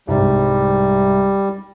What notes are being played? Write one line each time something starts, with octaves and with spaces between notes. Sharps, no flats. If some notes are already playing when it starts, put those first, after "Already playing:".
C2 G#2 G3